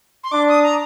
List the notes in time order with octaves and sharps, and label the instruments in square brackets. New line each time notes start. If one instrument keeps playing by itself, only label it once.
[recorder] C6
[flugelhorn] D4 [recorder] D6
[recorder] D#6
A#5